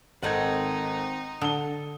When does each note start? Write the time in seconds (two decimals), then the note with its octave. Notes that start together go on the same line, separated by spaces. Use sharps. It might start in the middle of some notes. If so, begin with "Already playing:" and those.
0.23 G#1 C4 D#4 A4 D#5 F#5 G#6
1.41 D3 A4 D#6 G7